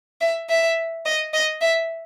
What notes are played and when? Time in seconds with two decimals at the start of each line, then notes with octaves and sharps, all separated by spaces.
0.21 E5
0.50 E5
1.06 D#5
1.34 D#5
1.61 E5